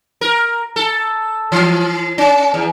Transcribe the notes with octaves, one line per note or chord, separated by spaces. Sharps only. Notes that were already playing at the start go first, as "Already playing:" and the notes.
A#4
A4
E3
C#4
E2